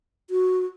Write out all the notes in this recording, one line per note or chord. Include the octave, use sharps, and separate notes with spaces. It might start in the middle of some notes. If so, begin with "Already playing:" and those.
F#4